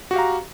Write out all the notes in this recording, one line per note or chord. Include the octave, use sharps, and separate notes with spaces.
F#4 G4 F5 A#5